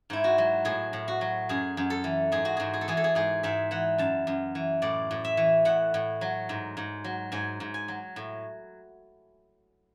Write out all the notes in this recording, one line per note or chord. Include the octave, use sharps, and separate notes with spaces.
G#2 E4
F#4
F#3
A2 G#4
A2
F#4
F#3
F#2 G#4
F#2
A4
E3
G#2 G#4
F#4
G#2 G#4
G#4
A4
E3 G#4
A4
G#4
G#2 G#4
G#2 E5
E3 F#5
F#2 A5
F#2
E3
A2 D5
A2
E5
E3
A2 F#5
A2
F#3
G#2
G#2
F#3
G#2 G#5
G#2
G#5
F#3
A2